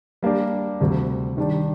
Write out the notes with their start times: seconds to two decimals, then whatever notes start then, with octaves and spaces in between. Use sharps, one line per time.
0.23 G3 A#3 D4 G4
0.80 D2 C3 G3
1.37 D#3 G3 D4 G4